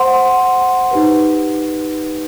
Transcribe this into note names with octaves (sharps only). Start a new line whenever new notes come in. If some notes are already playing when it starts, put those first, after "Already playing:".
Already playing: C5 F#5 C6
D#4 G4 B4